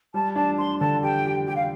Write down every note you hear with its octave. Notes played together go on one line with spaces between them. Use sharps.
G3 A5
D4 A5
D4 C6
D3 A5
G4 G5
G4
G4 G5
F5